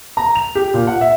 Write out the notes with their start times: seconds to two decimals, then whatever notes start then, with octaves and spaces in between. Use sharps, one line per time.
0.17 A#5
0.36 F7
0.55 G4
0.74 A#2
0.87 F#5
1.01 E5